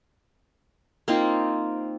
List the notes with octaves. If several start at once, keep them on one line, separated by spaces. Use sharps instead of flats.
A#3 C4 D#4 F4